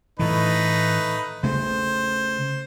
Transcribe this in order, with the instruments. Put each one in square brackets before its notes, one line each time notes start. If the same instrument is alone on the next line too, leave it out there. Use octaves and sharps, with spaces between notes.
[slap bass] A2 E3 [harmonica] A3 D#4 B4
[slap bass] C#3 A3 [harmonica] C5